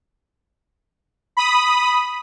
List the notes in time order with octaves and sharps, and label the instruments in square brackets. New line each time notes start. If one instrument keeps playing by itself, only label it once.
[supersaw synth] B5 D#6